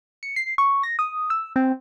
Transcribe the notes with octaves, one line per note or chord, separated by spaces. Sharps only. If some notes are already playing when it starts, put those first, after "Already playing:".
C#7
C7
C#6
A#6
D#6
E6
C4